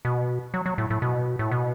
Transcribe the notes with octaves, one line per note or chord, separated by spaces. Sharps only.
B2
F#3
F#3
A2
A2
B2
A2
B2